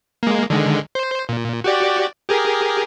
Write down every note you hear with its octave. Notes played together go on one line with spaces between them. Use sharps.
G#3 A#3
D3 D#3 G#3
C5
A#2
F#4 G4 D5
G4 G#4 A#4